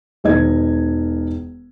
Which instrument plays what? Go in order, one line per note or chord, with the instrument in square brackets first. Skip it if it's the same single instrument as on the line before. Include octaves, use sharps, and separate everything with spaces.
[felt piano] E1 D#3 D#5 G#6